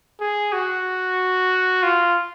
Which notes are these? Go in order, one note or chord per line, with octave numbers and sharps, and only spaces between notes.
G#4
F#4
F4